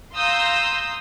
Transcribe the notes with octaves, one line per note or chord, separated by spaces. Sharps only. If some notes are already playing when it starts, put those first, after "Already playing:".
F5 A#5 C6 D#6 E6 G6